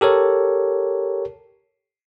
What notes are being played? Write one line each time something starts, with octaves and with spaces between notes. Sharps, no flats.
G4 A4 A#4 C#5